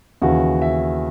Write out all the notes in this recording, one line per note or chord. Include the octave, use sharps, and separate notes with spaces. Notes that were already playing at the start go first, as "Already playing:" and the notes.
D#2 C#3 E3 F#4
E5